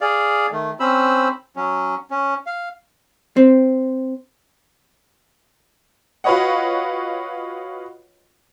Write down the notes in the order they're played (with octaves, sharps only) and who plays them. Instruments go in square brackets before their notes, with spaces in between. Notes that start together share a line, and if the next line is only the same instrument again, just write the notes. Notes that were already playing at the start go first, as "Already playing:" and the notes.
[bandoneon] G#4 D5 F5
D#3 A3
C4 C#4 C5 B5 E6
F#3 C#4
C#4
F5
[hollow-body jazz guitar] C4
[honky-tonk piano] F4 F#4 B4 C#5 D#5 F#5